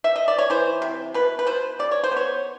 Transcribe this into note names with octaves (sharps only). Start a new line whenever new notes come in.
E5
D#5
D5
C#5
E3 C5
C3
B2 B4
B4
B2 C5
C#3 D5
C#5
C5
B3
C#5